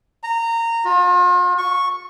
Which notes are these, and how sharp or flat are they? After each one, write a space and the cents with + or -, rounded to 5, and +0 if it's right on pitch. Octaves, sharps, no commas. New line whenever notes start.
A#5 -20
F4 +40
C#6 -5